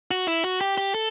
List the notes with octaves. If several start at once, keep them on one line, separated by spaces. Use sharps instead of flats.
F#4
E4
F#4
G4
G4
A4